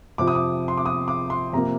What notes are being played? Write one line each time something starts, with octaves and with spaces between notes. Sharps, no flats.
F2 C3 F3 D6
D#6
D6
C6
D6
D#6
D6
C6
C3 F3 A#3 A#5